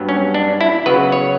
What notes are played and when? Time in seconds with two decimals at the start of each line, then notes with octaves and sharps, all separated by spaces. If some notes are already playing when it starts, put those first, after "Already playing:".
Already playing: G2 F#3 B3
0.09 C#4
0.34 D4
0.61 E4
0.86 C#3 F#3 B3 B4
1.12 C#5